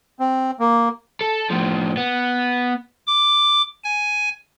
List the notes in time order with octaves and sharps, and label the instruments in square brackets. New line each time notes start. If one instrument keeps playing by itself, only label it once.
[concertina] C4
A#3
[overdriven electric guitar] A4
A2 F3
B3
[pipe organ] D6
G#5